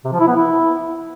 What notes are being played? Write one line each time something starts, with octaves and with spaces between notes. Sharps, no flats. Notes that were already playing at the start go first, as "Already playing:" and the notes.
C3
F3
E4
B3
E4